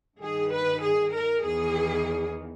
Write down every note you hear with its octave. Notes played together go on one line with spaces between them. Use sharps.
G2 D#3 G#4
B4
G#4
A#4
E2 D#3 G#4